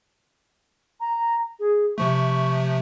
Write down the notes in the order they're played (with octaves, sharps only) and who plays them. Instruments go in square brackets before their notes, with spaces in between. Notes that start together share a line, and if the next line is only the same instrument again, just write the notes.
[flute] A#5
G#4
[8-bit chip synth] C3 F3 A3 [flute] C#6